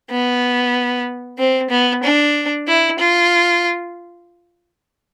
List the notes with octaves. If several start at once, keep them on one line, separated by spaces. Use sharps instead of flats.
B3
C4
B3
D4
E4
F4